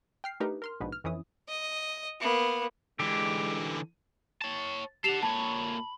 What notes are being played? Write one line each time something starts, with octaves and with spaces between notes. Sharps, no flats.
G5 F6 C7
A3 D4 D#4 G4 A#4 B4
A#4 C6 F6
A#1 G#2 B2 B4
F6
F2 E3 C#4 E4 D#6
D#5
A#3 B3
D3 E3 G#3 G4
C#5 A5
G4 A4 F#5 C7 E7 F7
A#2 C#5 A5 B5